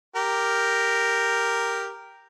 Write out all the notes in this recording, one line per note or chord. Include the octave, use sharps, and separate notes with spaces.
G4 A#4